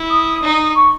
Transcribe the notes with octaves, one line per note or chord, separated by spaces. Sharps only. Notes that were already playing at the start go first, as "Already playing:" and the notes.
Already playing: E4
D#6
D#4
C#6